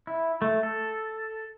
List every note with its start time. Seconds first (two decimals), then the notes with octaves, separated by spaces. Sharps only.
0.07 E4
0.42 A3
0.63 A4